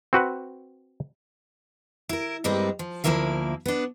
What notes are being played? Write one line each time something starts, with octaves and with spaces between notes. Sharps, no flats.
C4 F#4 B4 F#5
E4 A#4
G2 G3 G#3 A#3 C4
F3
D2 D#3 F3 A#3 E4 F5
B3 D4